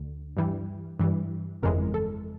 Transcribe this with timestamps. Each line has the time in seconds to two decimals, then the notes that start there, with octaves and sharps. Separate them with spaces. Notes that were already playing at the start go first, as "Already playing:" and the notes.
Already playing: D2 D3
0.37 G2 E3 G3
0.99 G2 E3 G3
1.62 G1 F2 C#3 E3 G#3 A#4
1.94 A4